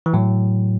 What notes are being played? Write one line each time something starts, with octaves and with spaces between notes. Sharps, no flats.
E3
A2 F#3